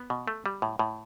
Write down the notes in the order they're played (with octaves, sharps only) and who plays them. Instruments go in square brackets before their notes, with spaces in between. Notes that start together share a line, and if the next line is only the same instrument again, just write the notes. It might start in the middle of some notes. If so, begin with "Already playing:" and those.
Already playing: [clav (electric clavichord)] B3
B2
A3
G3
A2
A2